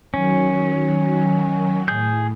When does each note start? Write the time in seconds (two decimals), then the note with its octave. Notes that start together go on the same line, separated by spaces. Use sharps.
0.14 D#3 F#3 C#4
1.88 A2 G#4 G6